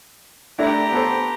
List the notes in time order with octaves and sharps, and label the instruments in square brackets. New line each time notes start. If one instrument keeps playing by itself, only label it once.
[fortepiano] A3 D4 E4 [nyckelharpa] G4 A#5
[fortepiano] B3 A4 C5